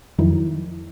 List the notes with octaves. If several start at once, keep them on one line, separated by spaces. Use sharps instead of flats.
F2 D#3 F3 F#3 D#4 E4